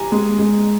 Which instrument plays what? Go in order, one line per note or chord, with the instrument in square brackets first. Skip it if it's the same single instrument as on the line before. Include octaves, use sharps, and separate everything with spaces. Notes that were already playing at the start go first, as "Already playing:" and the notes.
Already playing: [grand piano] G4 [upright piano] G#5 A#5
[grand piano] G#3
G#3